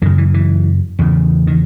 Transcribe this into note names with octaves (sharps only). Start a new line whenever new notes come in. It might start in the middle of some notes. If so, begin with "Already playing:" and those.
F#2 C#3 D#3
E3
E3
E2 C#3
D#3